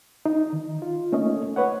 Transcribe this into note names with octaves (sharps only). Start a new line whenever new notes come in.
D#4
D#3
F4
A3 A#3 C#4 D#4 D#5
B4 C#5 F#5